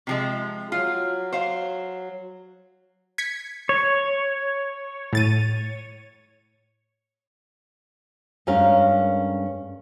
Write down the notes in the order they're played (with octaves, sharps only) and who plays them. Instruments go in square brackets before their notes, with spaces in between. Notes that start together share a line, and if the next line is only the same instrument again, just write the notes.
[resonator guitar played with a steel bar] C3 F3 G#3
[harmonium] F#3 [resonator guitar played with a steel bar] F4
[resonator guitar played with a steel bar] C5 F5
[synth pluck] G#6 B6 C#7
[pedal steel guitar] C#5
[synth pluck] A2 A6 D#7
[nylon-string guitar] G2 G#3 C#4 A#4 F5